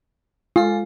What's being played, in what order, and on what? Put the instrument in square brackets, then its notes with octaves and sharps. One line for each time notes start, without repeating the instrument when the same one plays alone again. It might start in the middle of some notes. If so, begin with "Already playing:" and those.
[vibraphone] G#3 A4 [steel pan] F4